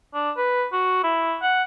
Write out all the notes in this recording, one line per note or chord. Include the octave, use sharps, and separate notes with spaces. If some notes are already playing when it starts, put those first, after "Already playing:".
D4
B4
F#4
E4
F#5